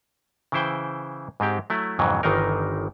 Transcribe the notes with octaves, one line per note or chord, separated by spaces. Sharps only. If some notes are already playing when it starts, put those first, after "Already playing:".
C#3 E3 E4 C5 G5
G#2 G#3 C4 G4
F#3 A3 E4
F2 G#2 C#3 E3 F#3
G1 D#3 E3 D4 D#4 A#4